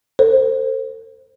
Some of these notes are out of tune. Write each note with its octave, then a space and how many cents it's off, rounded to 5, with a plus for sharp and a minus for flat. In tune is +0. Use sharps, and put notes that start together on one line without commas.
A4 +45 C5 +5